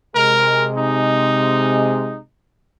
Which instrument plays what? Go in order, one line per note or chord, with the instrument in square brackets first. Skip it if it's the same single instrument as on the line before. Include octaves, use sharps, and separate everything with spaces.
[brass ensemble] C3 G#3 [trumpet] A#4
[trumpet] D#4